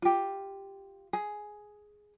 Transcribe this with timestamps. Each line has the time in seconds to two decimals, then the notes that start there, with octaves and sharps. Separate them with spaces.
0.02 F4 G4
1.13 G#4